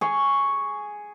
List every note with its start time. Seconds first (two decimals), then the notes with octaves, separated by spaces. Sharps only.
0.01 G#4 C#6